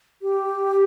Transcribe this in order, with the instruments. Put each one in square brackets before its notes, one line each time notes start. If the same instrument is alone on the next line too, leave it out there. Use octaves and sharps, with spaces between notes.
[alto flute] G4